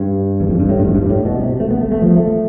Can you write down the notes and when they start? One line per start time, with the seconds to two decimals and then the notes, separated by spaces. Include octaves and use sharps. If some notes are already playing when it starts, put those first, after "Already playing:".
Already playing: G2
0.40 E2
0.49 F2
0.60 G2
0.69 A2
0.79 G2
0.88 F2
0.95 G2
1.10 A2
1.25 B2
1.40 C3
1.60 A3
1.71 B3
1.81 A3
1.92 A3
2.02 F3
2.17 A3